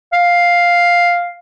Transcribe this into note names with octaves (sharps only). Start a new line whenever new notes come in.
F5